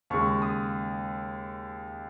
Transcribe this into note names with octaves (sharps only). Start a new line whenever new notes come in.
D#2 C#3 G#3 C#6
D#6